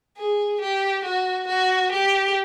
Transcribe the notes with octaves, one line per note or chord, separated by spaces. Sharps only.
G#4
G4
F#4
F#4
G4